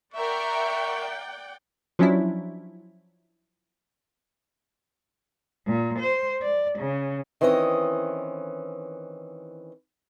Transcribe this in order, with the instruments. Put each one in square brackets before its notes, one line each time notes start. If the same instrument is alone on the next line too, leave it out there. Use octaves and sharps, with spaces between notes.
[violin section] A#4 E5 [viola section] D5 F#5 G5 [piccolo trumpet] C#6
[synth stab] F3 F#3 C#4 D4 E4
[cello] A#2
C5
D5
C#3
[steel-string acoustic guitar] D#3 E3 C4 C#4 A#4 D#5